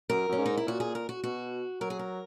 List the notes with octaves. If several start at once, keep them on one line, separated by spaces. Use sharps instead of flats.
F#2 A#4
F#2 C#4
G#2
D#4
E4
A#2 F#4
G#4
A#4
F#4
B2 F#4
F#3 A#4
G#4
A#4